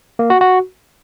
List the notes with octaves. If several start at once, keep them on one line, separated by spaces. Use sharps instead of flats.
A#3
F#4
F#4